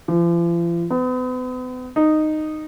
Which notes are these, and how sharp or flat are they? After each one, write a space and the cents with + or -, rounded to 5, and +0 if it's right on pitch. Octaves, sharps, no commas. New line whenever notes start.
F3 -45
B3 +40
D#4 -10